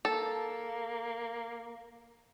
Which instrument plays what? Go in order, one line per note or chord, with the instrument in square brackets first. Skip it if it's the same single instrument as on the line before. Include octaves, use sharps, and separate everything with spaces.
[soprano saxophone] A#3 [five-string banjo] A4